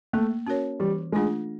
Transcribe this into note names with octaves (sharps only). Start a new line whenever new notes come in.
A3 A#3
C#4 F#4 A#4 C#5
E3 G3
G#3 A3 D4 F4 G#4